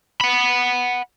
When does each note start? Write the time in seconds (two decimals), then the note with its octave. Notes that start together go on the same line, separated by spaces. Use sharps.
0.21 F#5 B5